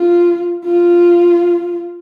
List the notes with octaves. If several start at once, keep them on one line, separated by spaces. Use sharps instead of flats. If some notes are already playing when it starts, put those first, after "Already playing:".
Already playing: F4
F4